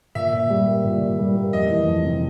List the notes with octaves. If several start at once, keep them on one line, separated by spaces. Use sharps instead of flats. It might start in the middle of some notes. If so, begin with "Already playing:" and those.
A#2 E5
A#2
G3
A#3
A#2
A#2
G3
A#3
F1 D#5
E3
F2
C3